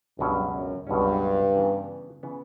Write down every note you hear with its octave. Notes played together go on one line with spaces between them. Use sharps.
C#2 G2 B2 F#3 C#4
F#2
C#2 G2 B2 F#3 C#4
C#3 E3 B3
C#3 E3 B3